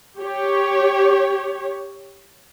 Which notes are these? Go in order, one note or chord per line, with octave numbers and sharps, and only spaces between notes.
G4 C#5